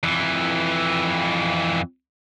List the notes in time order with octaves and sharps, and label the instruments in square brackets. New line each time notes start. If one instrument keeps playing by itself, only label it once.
[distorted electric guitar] F2 E3